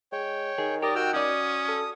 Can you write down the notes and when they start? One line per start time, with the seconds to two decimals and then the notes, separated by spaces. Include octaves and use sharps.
0.12 G#3 C#5 G5
0.58 D#3 G#4
0.82 G4 A#4 D5 D#5
0.95 F#4 G5 E6 F6
1.13 C#4 F#4 D5 D#6
1.68 A4